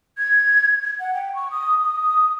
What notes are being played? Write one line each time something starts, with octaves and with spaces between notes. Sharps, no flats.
G#6
F#5
G5
C#6
D#6
D#6